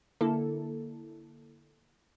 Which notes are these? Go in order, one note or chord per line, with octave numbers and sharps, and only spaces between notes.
D3 A#3 E4 A4